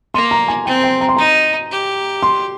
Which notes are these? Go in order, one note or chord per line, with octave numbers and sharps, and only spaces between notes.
A#3 C6
A#5
G#5
C4 G5
G5
A#5
C6
D#4 A#5
G4
C6